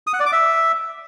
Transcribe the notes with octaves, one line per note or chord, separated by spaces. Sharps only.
D#6
F#5
D5
D6
E5